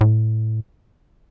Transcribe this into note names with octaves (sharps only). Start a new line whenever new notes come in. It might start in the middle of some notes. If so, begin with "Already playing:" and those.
A2